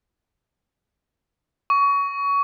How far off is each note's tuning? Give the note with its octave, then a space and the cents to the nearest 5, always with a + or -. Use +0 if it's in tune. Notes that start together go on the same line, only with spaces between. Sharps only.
C#6 +25